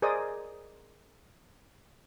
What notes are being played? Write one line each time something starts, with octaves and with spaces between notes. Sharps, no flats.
G#4 A#4 C5 D5 D#5 D#6